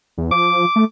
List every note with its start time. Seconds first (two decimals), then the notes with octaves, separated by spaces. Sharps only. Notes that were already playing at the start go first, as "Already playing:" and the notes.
0.18 E2
0.32 F3 D6
0.76 A3